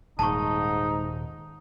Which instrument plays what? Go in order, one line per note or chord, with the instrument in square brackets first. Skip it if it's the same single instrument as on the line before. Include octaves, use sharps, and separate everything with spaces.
[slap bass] D#1 [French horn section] G#2 [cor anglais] D#4 [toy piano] A5 C#6